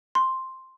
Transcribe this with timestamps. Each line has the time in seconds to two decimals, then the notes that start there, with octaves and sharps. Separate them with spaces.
0.15 C6